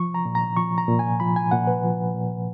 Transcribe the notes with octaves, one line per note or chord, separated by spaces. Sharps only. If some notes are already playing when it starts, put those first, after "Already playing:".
Already playing: F3 C#6
A#5
A#2
A#5
F3 C#6
A#5
A#2
G#5
F3 B5
G#5
A#2 F#5
B4
F3
A#2